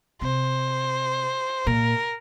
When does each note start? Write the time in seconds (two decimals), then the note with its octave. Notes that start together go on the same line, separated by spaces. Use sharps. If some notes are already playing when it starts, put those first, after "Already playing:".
0.21 C3 C5
1.67 A#2 A#4